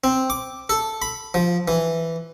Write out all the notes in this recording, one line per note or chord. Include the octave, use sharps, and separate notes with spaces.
C4
D6
A4
B5
F3
E3